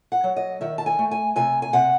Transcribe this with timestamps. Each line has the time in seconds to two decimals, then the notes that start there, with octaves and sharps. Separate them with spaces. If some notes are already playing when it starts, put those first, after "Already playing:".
0.12 F#5
0.24 F#3
0.36 D#5
0.61 D#3 E5
0.78 A5
0.86 G#5
0.99 A3
1.11 G#5
1.36 C3 G#5
1.62 G#5
1.73 C3 F#5